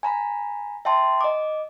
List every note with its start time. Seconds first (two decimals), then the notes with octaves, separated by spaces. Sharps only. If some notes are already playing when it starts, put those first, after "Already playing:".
0.03 G#5 A#5 B5
0.85 E5 G5 A5 C6
1.21 D#5 D6